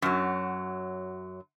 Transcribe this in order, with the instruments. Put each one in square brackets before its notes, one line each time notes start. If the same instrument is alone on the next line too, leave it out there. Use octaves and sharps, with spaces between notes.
[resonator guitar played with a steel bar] F#2 F#3